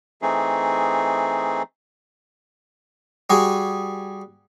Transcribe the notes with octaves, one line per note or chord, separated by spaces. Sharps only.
E3 A3 C4 D#4 G#4
G3 F#4 G#4